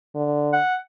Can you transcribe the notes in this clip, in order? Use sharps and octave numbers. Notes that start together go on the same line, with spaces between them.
D3
F#5